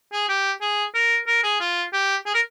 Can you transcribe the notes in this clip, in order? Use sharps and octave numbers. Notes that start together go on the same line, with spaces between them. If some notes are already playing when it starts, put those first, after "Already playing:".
G#4
G4
G#4
A#4
A#4
G#4
F4
G4
G#4
A#4